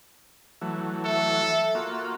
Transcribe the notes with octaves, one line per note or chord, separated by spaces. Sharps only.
E3 F#3 A3
A4 E5
A#3 F4 F#4